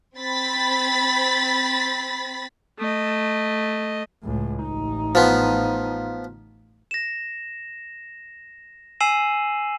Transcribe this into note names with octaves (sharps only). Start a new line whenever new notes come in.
C4 B5 A6 B6
A3 D#5
C#2 A2
A1 D#4
F3 B3
A#6 E7
G#5 E6 C7 D#7 E7 F#7